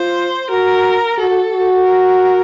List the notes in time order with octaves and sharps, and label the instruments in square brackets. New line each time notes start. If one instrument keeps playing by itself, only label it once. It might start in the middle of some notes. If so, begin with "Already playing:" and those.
Already playing: [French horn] F4 [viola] C5
[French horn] F#4 [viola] A#4
[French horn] F#4 [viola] A4
[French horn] F#4
[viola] A#4